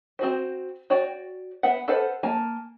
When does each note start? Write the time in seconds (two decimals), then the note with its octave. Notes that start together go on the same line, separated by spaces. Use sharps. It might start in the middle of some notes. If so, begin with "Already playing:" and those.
0.19 C4 F#4 C5
0.90 F#4 C#5 D5 G5
1.63 B3 E5 F#5
1.88 A4 B4 C5 F5 F#5
2.23 A#3 F5 G#5 A5